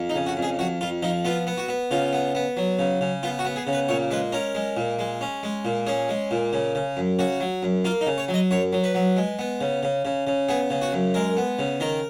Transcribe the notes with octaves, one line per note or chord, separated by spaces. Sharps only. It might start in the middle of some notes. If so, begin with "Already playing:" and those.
Already playing: F2
D#4
C#3
F#4
F2
G#4
F2 F#4
F2 F4
F3 D#4
B3 F4
B3
F#4
B3
C#3 F4
B3
B3
F#3
C#3
C#3
B3 F4
F#4
B3
G#4
C#3
B4
A#2 C#5
G#3 B4
C#4 A#4
G#3
A#2
G#3
C#4
G#3
A#2
C#4 G#4
G#3
A#2
C#3
C#3
F#2
C#3 F#4
F#3
F#2
A#3 F4
D#4
C#3
C#5
F#3
D#5
F#2 C#5
F#3
B4
F#3
G#3
B3
C#3
C#3
C#3
C#3
B3 G#4
C#3
F#4
F#2
G#3 A#4
B3
C#3
D#3 A#4